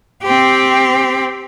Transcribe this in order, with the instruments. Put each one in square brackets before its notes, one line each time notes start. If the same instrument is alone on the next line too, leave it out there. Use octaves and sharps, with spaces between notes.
[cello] C4 G4